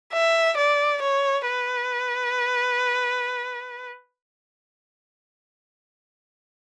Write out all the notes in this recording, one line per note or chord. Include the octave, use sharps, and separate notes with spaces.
E5
D5
C#5
B4